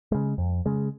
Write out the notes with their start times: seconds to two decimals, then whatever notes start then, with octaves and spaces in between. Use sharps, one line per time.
0.12 C#3 G#3
0.38 F2
0.66 C#3 G#3